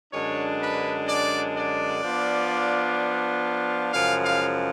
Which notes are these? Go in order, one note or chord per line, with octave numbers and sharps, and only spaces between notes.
F#2 D3 G#3 D4 C#5
B4
D5
D5
F3 B3 D4 F4
F#2 C#3 F3 G#3 F5
F5